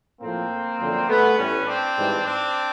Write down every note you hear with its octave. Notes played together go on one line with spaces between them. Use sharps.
A2 F3 A#3 C4
F#2 D3 F3
A3 B3
A2 E3 G3 B3 C#4
C4 D4
G#2 E3 G3
C4 D4